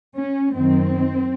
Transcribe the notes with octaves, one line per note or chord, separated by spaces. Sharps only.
C#4
F#2 D#3 C4